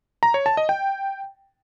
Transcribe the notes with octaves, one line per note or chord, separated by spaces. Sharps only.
A#5
C#5
A5
D#5
G5